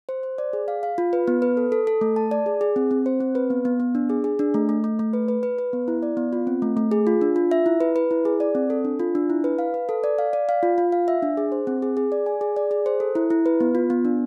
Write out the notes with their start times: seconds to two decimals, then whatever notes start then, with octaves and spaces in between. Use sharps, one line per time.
0.09 C5
0.23 C5
0.38 D5
0.53 G#4
0.68 F5
0.83 F5
0.98 F4
1.13 B4
1.28 B3
1.42 B4
1.57 A4
1.72 A4
1.87 A4
2.01 A3
2.16 A5
2.31 D5
2.46 G#4
2.61 G#4
2.76 C4
2.91 C4
3.06 C5
3.21 C4
3.35 B4
3.50 B3
3.65 B3
3.80 B3
3.95 D4
4.10 G#4
4.24 G#4
4.39 D4
4.54 A3
4.69 A3
4.84 A3
4.99 A3
5.13 B4
5.28 B4
5.43 B4
5.58 B4
5.73 B3
5.88 E4
6.03 D5
6.17 B3
6.33 F4
6.47 C4
6.62 A3
6.77 A3
6.91 G#4
7.07 F4
7.21 D4
7.36 F4
7.51 E5
7.66 E4
7.81 B4
7.96 B4
8.11 E4
8.25 G#4
8.40 D5
8.55 C4
8.70 A4
8.85 D4
9.00 F4
9.15 D4
9.30 E4
9.44 B4
9.59 F5
9.74 B4
9.89 A4
10.04 D5
10.18 F5
10.33 D5
10.49 F5
10.63 F4
10.78 F4
10.92 F5
11.08 E5
11.22 D4
11.37 G#4
11.52 C5
11.67 C4
11.82 G#4
11.97 G#4
12.12 D5
12.26 G#5
12.41 G#4
12.56 D5
12.71 G#4
12.86 C5
13.00 A4
13.15 E4
13.30 E4
13.46 B4
13.60 B3
13.75 F4
13.90 B3
14.05 D4